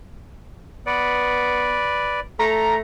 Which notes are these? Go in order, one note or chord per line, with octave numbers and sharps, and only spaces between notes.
B3 B4 D5
A3 A4 A#5